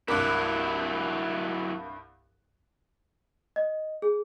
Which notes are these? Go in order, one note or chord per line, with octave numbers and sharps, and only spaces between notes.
C2 G2 F#3 E4 A#4 D6 F#6
D#5
G#4